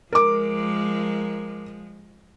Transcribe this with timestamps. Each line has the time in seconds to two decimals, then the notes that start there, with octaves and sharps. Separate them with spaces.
0.12 F3 G#3 A#4 D6